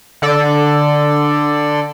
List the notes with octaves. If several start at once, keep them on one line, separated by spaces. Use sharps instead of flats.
D3 A4 D5